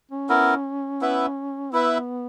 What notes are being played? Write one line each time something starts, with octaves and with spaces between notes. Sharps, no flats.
C#4
B3 E4 A#4
B3 E4 B4 E5
B3 E4 B4 E5